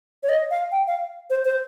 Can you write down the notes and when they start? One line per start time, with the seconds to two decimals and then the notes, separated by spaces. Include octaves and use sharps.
0.23 C#5
0.29 D#5
0.51 F5
0.72 G5
0.87 F5
1.30 C5
1.45 C5